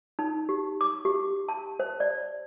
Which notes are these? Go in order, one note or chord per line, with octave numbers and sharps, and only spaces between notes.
D#4
G4
D6
G4
A5
C5
D5